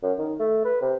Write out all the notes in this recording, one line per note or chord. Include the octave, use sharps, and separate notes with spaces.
F#2
D#3
A3
B4
C3